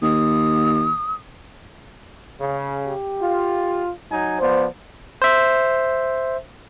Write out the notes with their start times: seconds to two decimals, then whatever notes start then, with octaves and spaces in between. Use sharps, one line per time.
0.03 D#2 D#6
2.39 C#3
2.85 G4
3.21 F4
4.11 F#3 D#4 G#5
4.40 F3 B3 C5 D5
5.22 C5 E5